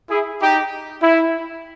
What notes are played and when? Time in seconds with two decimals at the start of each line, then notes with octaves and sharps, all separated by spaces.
0.09 E4 G#4
0.40 D#4 G4
1.01 E4